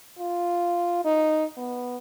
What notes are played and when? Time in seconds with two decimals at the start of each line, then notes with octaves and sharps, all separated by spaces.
0.19 F4
1.05 D#4
1.57 B3